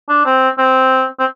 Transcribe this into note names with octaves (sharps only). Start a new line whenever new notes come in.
D4
C4
C4
C4